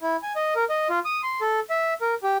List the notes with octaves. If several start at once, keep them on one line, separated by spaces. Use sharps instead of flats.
E4
G#5
D#5
A#4
D#5
F4
D#6
C6
A4
E5
A#4
G4